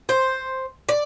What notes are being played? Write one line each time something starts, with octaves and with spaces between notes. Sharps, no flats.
C5
D5